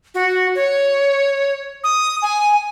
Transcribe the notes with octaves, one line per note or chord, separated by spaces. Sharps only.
F#4
C#5
D#6
G#5